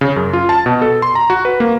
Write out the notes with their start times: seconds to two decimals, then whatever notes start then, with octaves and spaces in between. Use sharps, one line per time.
0.01 C#3
0.16 F#2
0.33 F4
0.49 A5
0.66 B2
0.82 A4
1.02 C6
1.15 A#5
1.30 F#4
1.45 B4
1.60 A#3